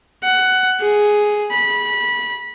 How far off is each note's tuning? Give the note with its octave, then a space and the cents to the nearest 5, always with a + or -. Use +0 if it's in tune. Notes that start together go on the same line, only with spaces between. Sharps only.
F#5 +15
G#4 +5
B5 -20